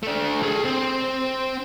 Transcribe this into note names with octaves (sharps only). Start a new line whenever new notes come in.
A3 D4
G#4 A4
C4